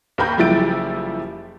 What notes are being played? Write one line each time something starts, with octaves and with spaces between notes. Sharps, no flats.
D#2 A#3 A#4 B5 G6
F#1 F3 G3 E4 A6 D7